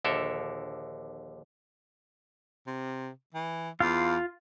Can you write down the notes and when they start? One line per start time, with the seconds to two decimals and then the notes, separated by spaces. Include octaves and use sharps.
0.04 A#1 D#2 D3 A4 A#4 E5
2.67 C3
3.34 E3
3.80 E2 F4 F5